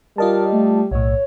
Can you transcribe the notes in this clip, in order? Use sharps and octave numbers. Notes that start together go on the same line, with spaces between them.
G3 F4 A#4 D#5 A5
A3
B1 A2 C#5